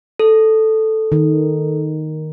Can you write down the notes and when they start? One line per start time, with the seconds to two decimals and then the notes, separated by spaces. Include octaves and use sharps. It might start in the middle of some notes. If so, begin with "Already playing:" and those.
0.19 A4
1.12 D#3